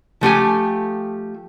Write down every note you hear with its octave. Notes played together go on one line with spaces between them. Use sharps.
F3 A3 G4 G#5